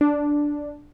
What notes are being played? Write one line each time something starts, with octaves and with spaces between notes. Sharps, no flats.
D4